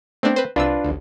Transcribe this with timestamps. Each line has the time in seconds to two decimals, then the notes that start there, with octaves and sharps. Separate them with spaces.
0.23 A3 B3 C4 D4
0.36 B4 C5
0.56 C2 C3 D4 F4 B4 E6
0.84 A1 D2